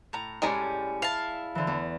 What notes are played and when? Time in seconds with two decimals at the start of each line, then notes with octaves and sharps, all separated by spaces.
0.13 A2 A#5
0.42 A2 G3 G#3 C#4 D5 G#5 A#5
1.02 E4 F5 A5
1.55 D3 E3
1.67 E2